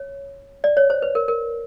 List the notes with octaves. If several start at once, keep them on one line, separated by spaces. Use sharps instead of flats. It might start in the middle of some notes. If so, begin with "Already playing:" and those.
Already playing: C#5
D5
C#5
C5
B4
A#4
A#4